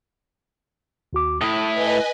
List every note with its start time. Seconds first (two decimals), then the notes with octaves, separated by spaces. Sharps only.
1.13 D#2 F#4 D6
1.41 A2 E4 D#6
1.72 B4 D#5 G#5